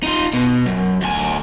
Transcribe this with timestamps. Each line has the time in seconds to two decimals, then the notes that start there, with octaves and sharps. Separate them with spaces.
0.04 D#4 F4
0.34 B2
0.66 F#2
1.02 D2 G#5